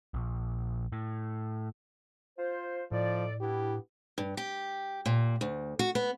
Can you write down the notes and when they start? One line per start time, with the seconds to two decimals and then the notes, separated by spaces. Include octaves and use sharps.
0.14 A#1
0.92 A2
2.38 F4 C5
2.91 A2 F3 D#4 A4 D5
3.41 B3 D4 E4 G4
4.18 G2
4.37 G4
5.06 A#2
5.41 D2
5.79 F#4
5.95 B3